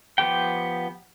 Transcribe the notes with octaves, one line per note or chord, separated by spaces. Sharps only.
F3 B3 G4 G5